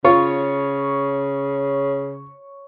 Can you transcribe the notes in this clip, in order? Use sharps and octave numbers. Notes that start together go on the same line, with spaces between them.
C#3 F4 C#5